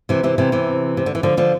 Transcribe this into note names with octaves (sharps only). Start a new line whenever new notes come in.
C3 E3
C3 E3
C3 E3
C3 E3
C3
D3
E3
D3 F3
D3 F3